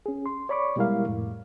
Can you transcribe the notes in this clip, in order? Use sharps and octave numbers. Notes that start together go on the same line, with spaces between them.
C#4 G#4
C6
C#5 D5 B5 C#6 D6
B2 G3 G#3 E4 A#4 F5
F2 A2